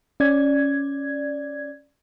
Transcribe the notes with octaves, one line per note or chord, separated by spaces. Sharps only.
C#4 D5 G#6